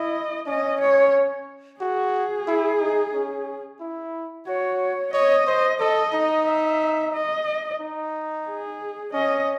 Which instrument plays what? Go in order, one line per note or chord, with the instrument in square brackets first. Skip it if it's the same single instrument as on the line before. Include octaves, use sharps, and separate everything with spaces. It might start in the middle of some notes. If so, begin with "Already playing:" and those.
Already playing: [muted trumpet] E4 [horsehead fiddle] D#5
[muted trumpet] C#4 [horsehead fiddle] D#5
[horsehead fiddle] C#5
[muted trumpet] F#4 [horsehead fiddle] G#4
[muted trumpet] E4
D#4
C#4
E4
[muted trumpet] F#4 [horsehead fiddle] C#5
[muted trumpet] C#5 [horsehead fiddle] D#5
[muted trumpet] C5
[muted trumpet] A4 [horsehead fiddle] D#5
[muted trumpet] D#4
[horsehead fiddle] E5
D#5
[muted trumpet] D#4
[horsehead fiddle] G#4
[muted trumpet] C#4 [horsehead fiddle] D#5